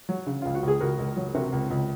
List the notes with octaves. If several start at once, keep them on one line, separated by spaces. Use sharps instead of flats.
F#3
C#3
C#2 F4
F#4
C#2
G#4
C#2 F#4 A#4
C#2
F#3
C3 F#4 A#4
C#2
C#2